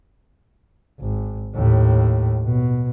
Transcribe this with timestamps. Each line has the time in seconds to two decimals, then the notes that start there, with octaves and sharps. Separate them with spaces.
1.00 G#1
1.55 D#2 A2
2.45 B2